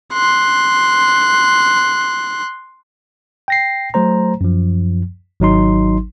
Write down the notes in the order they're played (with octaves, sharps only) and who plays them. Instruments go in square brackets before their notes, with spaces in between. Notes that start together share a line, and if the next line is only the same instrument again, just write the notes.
[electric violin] C6 F#6
[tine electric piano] G5 A#6 C7
F#3 A3 C5 A#5
F#2 F3
G#1 F#3 D#4 C6